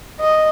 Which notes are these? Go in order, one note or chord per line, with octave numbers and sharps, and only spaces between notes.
D#5